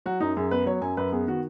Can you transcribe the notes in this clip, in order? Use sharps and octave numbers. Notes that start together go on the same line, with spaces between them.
F#3 F#4
F#2 D#4
F#2 G#4
B3 B4
F#3 C#5
F#2 G#5
F#2 B4
B3 G#4
D#3 F#4